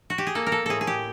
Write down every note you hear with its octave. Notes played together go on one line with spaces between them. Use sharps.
F#4
G4
G#4
A#3 A4
A#4
A4
A2 G#4 A4
G#4
G4